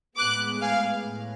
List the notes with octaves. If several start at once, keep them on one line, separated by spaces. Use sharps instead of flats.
A2 G#3 B3 D6 F#6
F5 G#5
A2